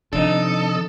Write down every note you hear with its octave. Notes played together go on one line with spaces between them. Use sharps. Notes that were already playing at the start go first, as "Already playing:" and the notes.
C3 D#3 F3 D4 D#4 A4 D#5